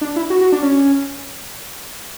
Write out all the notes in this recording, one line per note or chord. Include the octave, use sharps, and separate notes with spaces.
D4
E4
F#4
F#4
D4
C#4